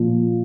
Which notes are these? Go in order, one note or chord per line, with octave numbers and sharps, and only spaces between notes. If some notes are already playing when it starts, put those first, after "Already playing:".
Already playing: A#2 F3